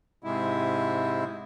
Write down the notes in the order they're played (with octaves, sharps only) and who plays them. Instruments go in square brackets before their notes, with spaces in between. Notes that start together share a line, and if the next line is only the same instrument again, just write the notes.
[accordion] G#2 C3 G#3 E4